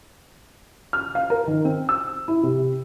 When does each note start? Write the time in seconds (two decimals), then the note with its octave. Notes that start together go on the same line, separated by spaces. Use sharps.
0.93 F6
1.15 F5
1.30 A#4
1.47 D#3
1.65 C4
1.89 E6
2.28 E4
2.43 C3